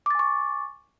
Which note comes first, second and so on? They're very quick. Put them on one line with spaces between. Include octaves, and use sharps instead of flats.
D6 A6 G#5 C#6